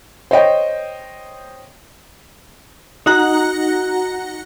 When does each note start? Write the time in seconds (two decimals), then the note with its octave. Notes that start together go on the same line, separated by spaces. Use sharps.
0.31 C5 C#5 D#5 G5
3.06 D#4 F#4 F#5 A#5 F#6